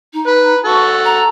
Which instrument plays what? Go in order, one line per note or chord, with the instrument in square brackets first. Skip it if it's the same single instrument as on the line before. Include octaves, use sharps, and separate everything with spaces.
[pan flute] D#4
[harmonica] B4
[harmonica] F#4 A4 [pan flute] C#6
[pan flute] A#5